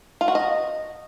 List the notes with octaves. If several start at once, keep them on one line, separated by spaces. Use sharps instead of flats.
F4
F#4
D#5